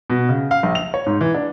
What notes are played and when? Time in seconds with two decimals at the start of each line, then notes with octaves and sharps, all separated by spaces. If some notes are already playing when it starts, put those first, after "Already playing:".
0.10 B2
0.29 C#3
0.51 F5
0.63 A#1
0.75 F7
0.94 C#5
1.06 G#2
1.21 E3
1.34 D4